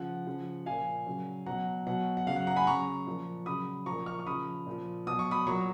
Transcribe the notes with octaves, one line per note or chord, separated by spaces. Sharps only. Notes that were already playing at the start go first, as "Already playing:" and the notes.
Already playing: C#3 F3 F#5
C#3 F3
A#2 F3 F5 G#5
C#3 F#3
B2 F#3 F#5 A#5
B2 F#3 F#5
F#5
C#3 F#3 F5
F#5
F#5 A#5
G#5 B5
C#3 F#3 A#5 C#6
A#2 F3
C#3 F#3 B5 D#6
A#2 F3 A#5 C#6
C#6 F6
C#6
C#3 F3 B5 D#6
A#2 F3
B2 F#3 D#6
C#6
B5 D#6
A#2 F#3 A#5 C#6